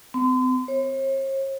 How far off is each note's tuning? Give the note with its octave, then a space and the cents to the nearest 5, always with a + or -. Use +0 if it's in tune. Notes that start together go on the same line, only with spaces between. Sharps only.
C4 -40
C#5 -45